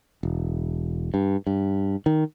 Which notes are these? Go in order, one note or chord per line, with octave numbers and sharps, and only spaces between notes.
E1
G2
G2
D#3